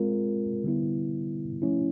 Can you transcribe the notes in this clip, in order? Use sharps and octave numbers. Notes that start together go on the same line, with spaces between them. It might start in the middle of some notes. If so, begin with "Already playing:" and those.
Already playing: G#3 C4 F4 A#4
D3 G3 B3 E4
F3 A3 C#4 E4